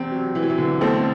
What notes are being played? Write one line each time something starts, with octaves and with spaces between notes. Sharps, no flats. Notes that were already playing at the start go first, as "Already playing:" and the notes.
Already playing: E2 C3 C4
F#3
E3
F#3
E3
D3
B2 A3 C4